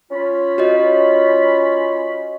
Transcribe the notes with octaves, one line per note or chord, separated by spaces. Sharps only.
C#4 F4 B5
F#4 C#5 D#5